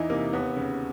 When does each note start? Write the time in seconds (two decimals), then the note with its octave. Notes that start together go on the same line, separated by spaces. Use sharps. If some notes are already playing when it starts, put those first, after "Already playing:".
Already playing: E2 E3 D#4 E4
0.10 C3 A#3
0.33 D#2 B3
0.56 C#3